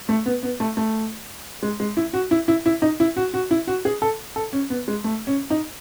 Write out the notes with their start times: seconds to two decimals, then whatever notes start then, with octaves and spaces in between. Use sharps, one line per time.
0.09 A3
0.26 B3
0.43 B3
0.60 A3
0.77 A3
1.63 G#3
1.80 G#3
1.97 E4
2.13 F#4
2.31 E4
2.48 E4
2.66 E4
2.82 D#4
3.00 E4
3.16 F#4
3.34 F#4
3.51 E4
3.67 F#4
3.85 G#4
4.02 A4
4.36 A4
4.53 C#4
4.70 B3
4.88 G#3
5.04 A3
5.27 C#4
5.50 D#4